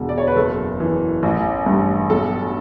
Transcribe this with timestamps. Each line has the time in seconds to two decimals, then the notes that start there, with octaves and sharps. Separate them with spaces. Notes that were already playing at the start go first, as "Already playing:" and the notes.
Already playing: E1 D3
0.09 D5
0.18 C#5
0.27 B4
0.36 F#1 A4
0.80 E3
1.23 A1
1.66 G2
2.10 B1 A4